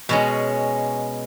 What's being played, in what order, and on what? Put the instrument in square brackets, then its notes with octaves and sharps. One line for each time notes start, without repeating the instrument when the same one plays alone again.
[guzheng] B2 G#3 C#4